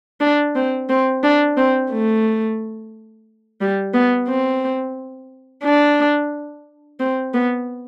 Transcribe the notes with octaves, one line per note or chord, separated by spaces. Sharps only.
D4
C4
C4
D4
C4
A3
G3
B3
C4
D4
C4
B3